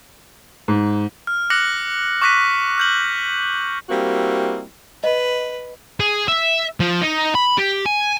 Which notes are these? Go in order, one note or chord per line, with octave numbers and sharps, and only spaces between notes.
G#2
F6
D6 F#6 A#6 C#7 F#7
C#6 D6 F#6 A#6 B6 D#7
F6 G6 F#7
G3 A#3 C4 E4 F#4
B4 D#5
G#4
E5
F3
D#4
B5
G4
G#5